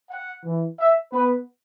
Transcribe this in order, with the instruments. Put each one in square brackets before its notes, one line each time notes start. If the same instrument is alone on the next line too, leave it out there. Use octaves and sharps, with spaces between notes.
[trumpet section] F#5
[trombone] E3
[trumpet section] E5
[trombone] B3 [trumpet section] B4